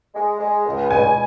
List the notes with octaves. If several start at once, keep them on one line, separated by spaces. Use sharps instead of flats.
G#3
G#3
C#2
B2 G#5